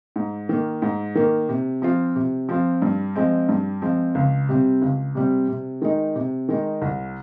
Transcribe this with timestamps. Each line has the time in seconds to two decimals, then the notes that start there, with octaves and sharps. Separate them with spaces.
0.16 G#2
0.49 D#3 A#3
0.82 G#2
1.15 D#3 A#3
1.49 C3
1.82 F3 C4 F4
2.16 C3
2.49 F3 C4 F4
2.82 G2
3.15 F3 G#3 C4
3.49 G2
3.82 F3 G#3 C4
4.15 C#2
4.49 C3 G3 C4
4.82 C#2
5.15 C3 G3 C4
5.48 C3
5.82 D#3 G#3 D#4
6.15 C3
6.49 D#3 G#3 D#4
6.82 C2